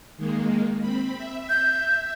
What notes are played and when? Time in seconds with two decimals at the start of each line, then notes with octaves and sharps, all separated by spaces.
0.17 D#3 G#3 A#3
0.81 C4 B5
1.17 E5
1.49 G6